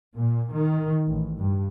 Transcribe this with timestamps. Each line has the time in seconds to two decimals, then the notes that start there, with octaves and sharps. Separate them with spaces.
0.16 A#2
0.53 D#3
1.08 A1
1.38 G2